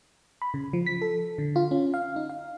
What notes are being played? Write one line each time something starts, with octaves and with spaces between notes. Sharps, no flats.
B5
C#3
F3
B6
A4
D3
F4
C#4
F5
D#4
F5